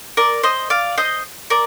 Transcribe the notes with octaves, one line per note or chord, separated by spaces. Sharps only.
A#4 D5
C5 D#5
D5 F5
C5 D#5
A#4 D5